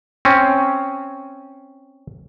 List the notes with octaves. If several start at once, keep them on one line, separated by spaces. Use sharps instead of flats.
C4 C#4